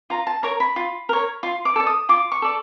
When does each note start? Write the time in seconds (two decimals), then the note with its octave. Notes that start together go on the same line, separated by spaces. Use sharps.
0.10 F4 A#5
0.27 A5
0.43 A#4 C#5 A#5
0.60 B5
0.76 F4
1.09 A#4 C#5
1.43 F4 C6
1.65 D6
1.76 A4 D5
1.87 D#6
2.09 F4 D6
2.32 C#6
2.42 A4 D5